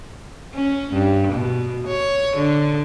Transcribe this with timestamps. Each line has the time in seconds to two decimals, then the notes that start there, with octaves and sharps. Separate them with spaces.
0.54 C#4
0.93 G2
1.32 B2
1.87 C#5
2.36 D3